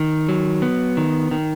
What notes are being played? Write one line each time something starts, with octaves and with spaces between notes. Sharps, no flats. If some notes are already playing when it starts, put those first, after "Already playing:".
Already playing: D#3
F#3
B3
D#3
D#3